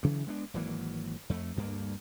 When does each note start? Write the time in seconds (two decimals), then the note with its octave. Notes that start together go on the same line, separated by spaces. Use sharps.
0.03 G2 C#3 E3 F#3
0.27 G#3 B3 C4 D4
0.54 G#1 E3 F#3 A#3
1.29 F2 A3
1.56 D2 G2 A#3